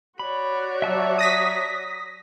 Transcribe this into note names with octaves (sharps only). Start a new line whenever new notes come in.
F#4 C#5 D5 B5
F#3 E5 A5 E6
D#6 A#6 B6